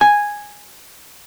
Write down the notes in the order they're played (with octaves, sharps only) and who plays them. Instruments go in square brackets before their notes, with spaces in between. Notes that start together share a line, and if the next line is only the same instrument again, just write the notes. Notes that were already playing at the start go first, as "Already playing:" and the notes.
[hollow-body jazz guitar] G#5